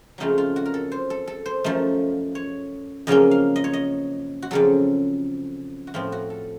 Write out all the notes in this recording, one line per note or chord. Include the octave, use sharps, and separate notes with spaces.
F2 C#3 F#3 A3 D#4 F4
F4
F#4
A#4
A4
C5
A4
A4
C5
F#2 F3 A3 D#4
C#5
F2 C#3 F#3 A#3 C#4 D#5
F5
D#5
C#5
D#5
F#4
F2 C#3 F#3 A4
F#4
A2 F3 C4 F4
F#4
A4